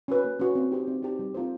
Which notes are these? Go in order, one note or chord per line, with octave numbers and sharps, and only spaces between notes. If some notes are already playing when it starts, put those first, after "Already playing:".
C#4 F#4 B4
A#3
C#4 F#4 B4
C4
D#4 G4 C5
C4
D#4 G4 C5
G3
C4 F4 A4 C5